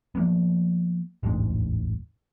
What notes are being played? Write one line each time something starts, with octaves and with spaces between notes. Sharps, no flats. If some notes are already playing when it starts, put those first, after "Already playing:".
F3 A#3 B3
E1 A1 D2 G#2